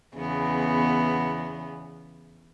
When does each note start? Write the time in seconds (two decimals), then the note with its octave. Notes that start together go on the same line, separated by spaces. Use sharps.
0.15 E2 C#3 B3